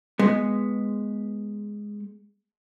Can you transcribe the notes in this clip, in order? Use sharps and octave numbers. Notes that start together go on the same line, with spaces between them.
G#3 B3